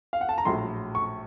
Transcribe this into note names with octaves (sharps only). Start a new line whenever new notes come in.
F5
F#5
A5
A#5
A#1 A2 F#3 C6
C#6